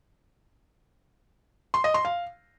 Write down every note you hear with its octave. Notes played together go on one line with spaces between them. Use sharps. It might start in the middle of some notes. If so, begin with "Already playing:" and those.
C6
D#5
C6
F5